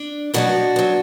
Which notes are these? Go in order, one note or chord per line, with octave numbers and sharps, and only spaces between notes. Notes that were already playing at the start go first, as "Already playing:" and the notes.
Already playing: D4
B2 F#3 B3 D4 F#4
F#3 B3